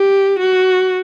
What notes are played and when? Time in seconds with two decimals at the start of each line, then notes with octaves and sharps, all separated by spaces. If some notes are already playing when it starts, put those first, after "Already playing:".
Already playing: G4
0.40 F#4